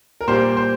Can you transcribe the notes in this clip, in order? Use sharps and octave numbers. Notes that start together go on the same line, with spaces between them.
A#4
A#2 G3 A#3 C5
C5